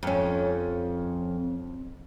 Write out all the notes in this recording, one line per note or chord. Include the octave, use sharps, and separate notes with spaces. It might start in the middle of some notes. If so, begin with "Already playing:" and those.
F2 C#4